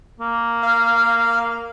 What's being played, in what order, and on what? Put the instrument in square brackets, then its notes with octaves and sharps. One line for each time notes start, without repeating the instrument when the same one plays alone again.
[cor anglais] A#3
[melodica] F5